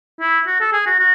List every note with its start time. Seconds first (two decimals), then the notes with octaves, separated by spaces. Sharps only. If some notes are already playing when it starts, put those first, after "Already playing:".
0.21 E4
0.47 F#4
0.61 A4
0.73 G#4
0.86 F#4
0.99 F#4